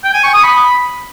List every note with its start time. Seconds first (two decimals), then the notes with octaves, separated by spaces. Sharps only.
0.04 G5
0.14 G#5
0.24 C#6
0.33 D#6
0.43 B5